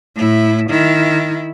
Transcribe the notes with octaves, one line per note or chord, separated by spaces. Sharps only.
A2 E4
D#3 E4